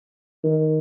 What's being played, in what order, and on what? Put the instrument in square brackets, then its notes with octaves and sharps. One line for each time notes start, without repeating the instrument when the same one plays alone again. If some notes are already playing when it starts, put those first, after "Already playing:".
[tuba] D#3